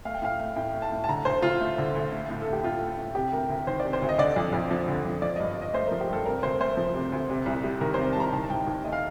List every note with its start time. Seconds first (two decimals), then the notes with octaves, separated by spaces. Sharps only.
0.05 A3 F5
0.14 G5
0.22 A2 F5
0.39 A3
0.56 A2 G5
0.74 A3
0.82 A5
0.92 A2
1.04 A5
1.09 D3 A#5
1.25 D2 C5
1.42 D2 F4
1.60 A3
1.78 D3
1.94 D2
2.12 A3
2.30 A2
2.42 A3 A4
2.53 G4
2.63 A2 F4
2.81 A3
2.98 A2
3.15 C3 G4
3.33 D2 A#4
3.49 D2 A#4
3.67 D#3 C5
3.80 C3 D5
3.93 C5
4.02 D2
4.09 D#5
4.18 D3 D5
4.36 F2
4.53 F2
4.71 F3
4.88 D3
5.05 F2
5.22 F3 D5
5.36 D#5
5.40 G2
5.48 D#5
5.56 G2
5.61 D#5
5.73 A3 C5
5.87 A#4
5.91 F3
6.01 G4
6.09 G2 A4
6.26 C3 A#4
6.43 D2 C5
6.60 A3 C5
6.77 F3
6.94 C3
7.12 D2
7.30 C3
7.46 C2
7.64 G3
7.81 D#3 A#4
7.94 C3 C5
8.13 A5
8.16 C2 A#5
8.33 D#3 A5
8.43 A5
8.50 D#2 G5
8.67 D#2
8.84 A3 D#5
8.92 F5